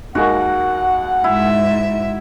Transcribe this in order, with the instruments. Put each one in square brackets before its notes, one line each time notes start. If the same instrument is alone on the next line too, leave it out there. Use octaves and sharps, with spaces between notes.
[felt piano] D#2 G#3 A#3 [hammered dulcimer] F#4 [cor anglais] F#5
[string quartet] G#2 E5 [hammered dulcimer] E4